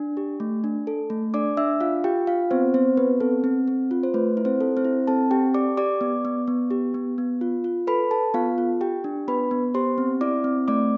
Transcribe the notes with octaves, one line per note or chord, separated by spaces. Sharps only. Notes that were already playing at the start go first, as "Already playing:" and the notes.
Already playing: D4
G4
A3
D4
A4
A3
D4 D5 D6
D4 E5 E6
F4 F5
F4 G4 G5
F4 F5
B3 C4 C5
B3 C4 C5
B3 B4
C4 A4
C4
C4
F4
C5
A3 B4
E4
C4 C5
A4
C4 C5
E4
C4 A4 A5
C4 G4 G5
G4 D5 D6
G4 D5 D6
B3
B3
B3
G4
B3
B3
F4
F4
A4 B4 B5
A4 A5
B3 F4 F5
F4
G4 G5
D4
B3 B4 B5
B3
G4 C5 C6
C4
E4 D5 D6
C4
A3 D5 D6